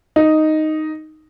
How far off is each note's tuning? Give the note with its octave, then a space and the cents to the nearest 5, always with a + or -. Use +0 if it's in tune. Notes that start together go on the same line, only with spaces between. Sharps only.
D#4 +0